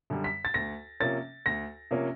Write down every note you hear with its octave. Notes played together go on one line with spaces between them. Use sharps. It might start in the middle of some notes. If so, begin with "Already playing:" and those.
F#2 D3 G3
B6
A6
D2 A#6
C3 F3 A#3 C#4 A6
D2 A#6
C3 F3 A#3 C#4